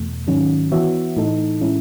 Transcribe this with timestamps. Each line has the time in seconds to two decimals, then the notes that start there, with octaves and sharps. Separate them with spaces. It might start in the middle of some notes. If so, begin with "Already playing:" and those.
Already playing: E2 B2 A3
0.27 G#2 D#3 F#3 C#4
0.72 E3 B3 F#4 C#5 E5
1.17 A2 E3 A3 D#4 A4
1.61 A2 E3 G#3 C#4 E4